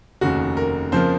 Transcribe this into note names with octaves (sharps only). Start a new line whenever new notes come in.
F1 D#2 C#3 F#4
A#4
F2 C#3 F3 A#3 C5